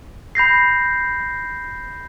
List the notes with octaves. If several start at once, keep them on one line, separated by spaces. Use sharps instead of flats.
B5 G6 A#6 C7